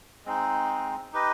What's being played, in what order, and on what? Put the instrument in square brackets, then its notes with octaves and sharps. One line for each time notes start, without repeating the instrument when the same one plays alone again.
[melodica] G#3 C4 D#4
D#4 G4 B4 D#5